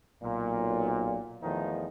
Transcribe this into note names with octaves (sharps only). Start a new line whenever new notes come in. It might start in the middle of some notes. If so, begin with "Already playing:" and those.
B1 A#2
E2 D#3 F3 A3 D#4